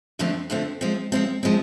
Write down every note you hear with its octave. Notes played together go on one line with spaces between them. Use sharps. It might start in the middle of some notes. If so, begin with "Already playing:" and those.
F2 D3 F3 A3 C4
F2 D3 F3 A3 C4
F3 G#3 C4
F3 G#3 C4
F3 G#3 C4